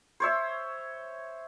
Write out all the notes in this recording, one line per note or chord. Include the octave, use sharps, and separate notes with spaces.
C5 C#5 E5